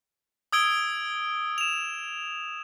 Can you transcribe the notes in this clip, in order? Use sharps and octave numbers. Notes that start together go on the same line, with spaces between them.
D#6 E6 G#6 D7 G7
E7 F7